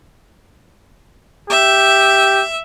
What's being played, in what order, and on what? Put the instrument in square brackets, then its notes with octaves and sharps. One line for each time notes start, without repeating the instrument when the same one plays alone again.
[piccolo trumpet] G4 [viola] E5